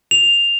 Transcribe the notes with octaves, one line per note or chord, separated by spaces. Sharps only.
F7